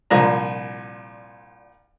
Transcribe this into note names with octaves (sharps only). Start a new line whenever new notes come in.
C2 A#2 F3 D4 A#5